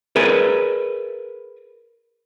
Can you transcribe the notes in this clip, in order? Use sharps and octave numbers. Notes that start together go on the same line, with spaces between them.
G#4 A#4 B4 D5 E5